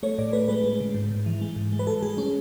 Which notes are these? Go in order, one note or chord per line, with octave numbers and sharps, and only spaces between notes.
A3 C#5
A2 D5
A3 B4
G#3 B4
G#3
C#3
G#2
G#2
E3
G#3
G#2
G#3
B4
G#3 A4
G#3 G#4
G#3 C#4